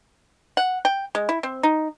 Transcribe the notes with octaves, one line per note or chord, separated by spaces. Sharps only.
F#5
G5
G#3
E4
C4
D#4